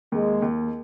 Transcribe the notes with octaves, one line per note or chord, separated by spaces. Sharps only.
D#2 G#3
D#2